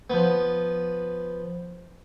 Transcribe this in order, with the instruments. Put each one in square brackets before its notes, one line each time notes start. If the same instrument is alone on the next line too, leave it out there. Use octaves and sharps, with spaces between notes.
[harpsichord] F3 B3